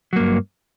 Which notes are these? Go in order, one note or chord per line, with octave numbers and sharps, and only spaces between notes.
G2 F#3 A#3